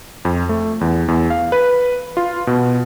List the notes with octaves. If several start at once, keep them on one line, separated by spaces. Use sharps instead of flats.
F2
A3
E2
E2
F5
B4
F4
B2